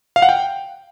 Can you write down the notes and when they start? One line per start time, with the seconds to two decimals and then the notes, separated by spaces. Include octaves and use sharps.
0.16 F5
0.22 F#5
0.29 G5